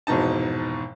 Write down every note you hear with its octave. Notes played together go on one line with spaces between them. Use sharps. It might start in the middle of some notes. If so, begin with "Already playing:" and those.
F1 G#2 B2 E3 D#4 A5